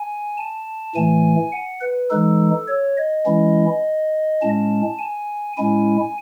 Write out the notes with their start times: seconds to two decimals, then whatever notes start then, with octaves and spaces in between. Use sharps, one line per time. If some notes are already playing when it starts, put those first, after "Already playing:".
Already playing: G#5
0.37 A5
0.95 A2 E3 A3 G#5
1.52 F#5
1.81 B4
2.10 E3 G#3 D#4 A4
2.68 C#5
2.97 D#5
3.26 E3 G#3 C#4 E4
4.42 A2 G#3 C#4 A5
4.99 G#5
5.57 A2 G#3 C#4 E4 G#5